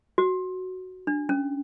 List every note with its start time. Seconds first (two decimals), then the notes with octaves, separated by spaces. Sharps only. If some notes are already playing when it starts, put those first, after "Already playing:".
0.18 F#4
1.07 D4
1.29 C#4